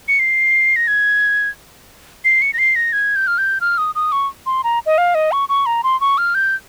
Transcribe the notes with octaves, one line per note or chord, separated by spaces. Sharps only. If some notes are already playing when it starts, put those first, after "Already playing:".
C#7
C7
A#6
G#6
C7
C#7
A#6
C7
A#6
G#6
G6
F6
G6
F6
D#6
D#6
C#6
C6
A#5
D#5
F5
D#5
C#6
C#6
A#5
C6
C#6
F6
G6